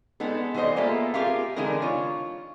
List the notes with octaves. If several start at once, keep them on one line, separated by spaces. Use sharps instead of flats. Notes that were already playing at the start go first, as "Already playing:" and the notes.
G#3 B3 D#4 A4
E3 G3 B4 C5 D#5
G#3 A#3 B3 F4 A4 E5
F4 G4 G#4 A#4 E5 F5
D3 E3 G#3 D#4 G#4 A#4
F4 C#5